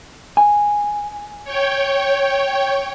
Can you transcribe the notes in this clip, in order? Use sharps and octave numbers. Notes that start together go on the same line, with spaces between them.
G#5
C#5 G5